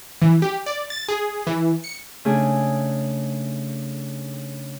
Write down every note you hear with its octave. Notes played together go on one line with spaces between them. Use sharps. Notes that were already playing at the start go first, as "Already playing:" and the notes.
E3
G4
D5
A6
G#4
E3
C#7
C#3 A3 D4 D#4 G#4